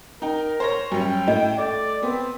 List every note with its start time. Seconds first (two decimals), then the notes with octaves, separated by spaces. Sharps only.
0.22 D#4 A#4 G5
0.60 C5 C#5 A#6
0.92 F#2 G3 C#4 G5
1.28 A2 D#5
1.59 A3 D5
2.03 B3 C4